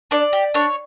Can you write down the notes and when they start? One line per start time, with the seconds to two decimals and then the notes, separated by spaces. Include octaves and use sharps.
0.11 D4 D5
0.33 G4
0.54 D4 C#5